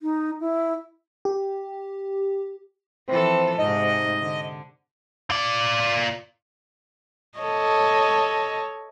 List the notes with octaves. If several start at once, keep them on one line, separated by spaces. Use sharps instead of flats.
D#4
E4
G4
E3 F3 C4 A4
G#2 C3 D#4 D#5
D3
F4 D5
A4 C#5 D#5